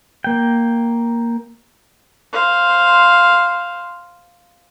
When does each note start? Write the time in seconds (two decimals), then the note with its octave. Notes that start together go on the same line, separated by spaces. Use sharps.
0.24 A#3 G5
2.33 C5 F5